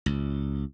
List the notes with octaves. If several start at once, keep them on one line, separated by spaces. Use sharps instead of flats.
C#2